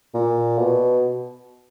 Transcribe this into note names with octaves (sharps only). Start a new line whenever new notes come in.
A#2
B2